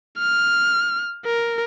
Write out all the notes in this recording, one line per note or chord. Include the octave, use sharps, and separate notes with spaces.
F6
A#4